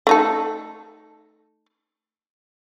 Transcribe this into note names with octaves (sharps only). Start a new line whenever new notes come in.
A3 D#4 A4